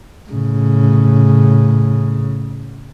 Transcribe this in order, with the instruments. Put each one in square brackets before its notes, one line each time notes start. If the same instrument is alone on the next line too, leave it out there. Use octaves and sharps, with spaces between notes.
[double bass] A2 C#3